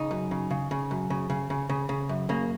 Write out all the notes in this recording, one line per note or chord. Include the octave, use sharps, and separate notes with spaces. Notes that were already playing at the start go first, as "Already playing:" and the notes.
Already playing: C#3 D#4
F#2
C#3
C#3
C#3
F#2
C#3
C#3
C#3
C#3
C#3
F#2
C#3 A#3